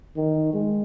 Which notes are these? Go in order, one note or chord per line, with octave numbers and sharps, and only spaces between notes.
D#3
G#3